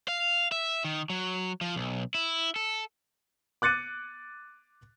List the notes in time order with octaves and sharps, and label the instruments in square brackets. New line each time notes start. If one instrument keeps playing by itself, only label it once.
[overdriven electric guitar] F5
E5
D#3
F#3
F3
B1
E4
A4
[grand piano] D6 F#6 A6 C#7 D#7